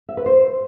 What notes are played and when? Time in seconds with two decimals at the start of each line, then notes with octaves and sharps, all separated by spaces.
0.09 E5
0.17 B4
0.26 C5